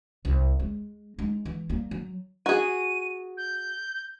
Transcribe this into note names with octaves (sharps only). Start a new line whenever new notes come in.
C2
G#3
G#3 D#4
E3
G3 A#3
F#3
F#4 G#4 D#7
G6